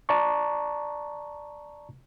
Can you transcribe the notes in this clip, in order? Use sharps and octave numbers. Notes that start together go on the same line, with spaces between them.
D5 A5 A#5 C#6